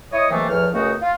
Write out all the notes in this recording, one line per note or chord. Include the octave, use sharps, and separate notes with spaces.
E4 C#5 D#5
C3 D#3 E3 F#3 A3 A#3
E2 A2 F3 C#5 F6
C#2 F#2 A3 B3 D#4 F#4
F4